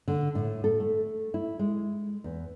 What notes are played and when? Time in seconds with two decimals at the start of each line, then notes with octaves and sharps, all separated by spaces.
0.08 D3
0.35 A2
0.64 A4
0.80 A3
1.34 E4
1.59 G#3
2.24 E2